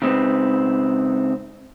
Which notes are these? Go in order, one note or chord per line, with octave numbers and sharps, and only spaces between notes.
C#3 G#3 C4 C#4 D#4 B4